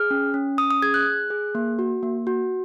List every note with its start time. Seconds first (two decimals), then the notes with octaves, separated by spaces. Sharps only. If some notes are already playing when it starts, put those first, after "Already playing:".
Already playing: G#4 F6
0.11 C#4
0.34 C#4
0.58 C#4 D#6
0.71 D#6
0.82 G#4 G#6
0.94 F#6
1.07 G#4
1.30 G#4
1.55 A#3
1.79 F#4
2.03 A#3
2.27 F#4